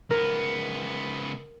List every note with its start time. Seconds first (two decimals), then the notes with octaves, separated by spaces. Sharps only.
0.11 C#2 B3 A#4